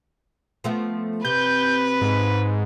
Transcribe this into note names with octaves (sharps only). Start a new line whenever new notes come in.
F3 A3 B3
C3 B4 G6
G#2